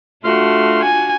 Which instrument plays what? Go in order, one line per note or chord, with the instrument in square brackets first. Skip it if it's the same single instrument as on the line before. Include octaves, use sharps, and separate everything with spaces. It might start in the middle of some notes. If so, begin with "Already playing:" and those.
[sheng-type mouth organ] A3 C6 F6 [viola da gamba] D4 F4 F#4
[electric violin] G#5